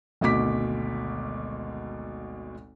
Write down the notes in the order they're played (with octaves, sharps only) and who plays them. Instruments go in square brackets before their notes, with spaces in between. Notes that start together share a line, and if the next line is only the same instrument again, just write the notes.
[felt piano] G#1 D2 B2 D6 B6